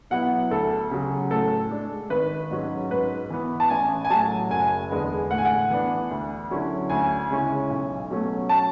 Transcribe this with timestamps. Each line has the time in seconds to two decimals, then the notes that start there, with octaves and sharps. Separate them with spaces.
0.10 B2 F#3 B3 E4 F#5
0.51 D2 A4
0.91 C#3 F#3
1.31 A2 A4
1.71 G#3 D4
2.10 G#1 B4
2.51 G#2 F#3 C#4
2.91 G#2 B4
3.30 E3 B3
3.60 A5
3.70 A1 G#5
4.05 G#5
4.10 A2 F#3 A5
4.50 F#1 G#5
4.90 E2 D3 G#3 B3
5.30 A2 F#5
5.38 G#5
5.45 F#5
5.70 E3 B3 D4
6.11 D2
6.51 D3 F#3 C#4 E4
6.90 D2 G#5
7.31 C#3 G#3 C#4 E4
7.70 B1
8.10 B2 F#3 A3 C#4
8.49 A5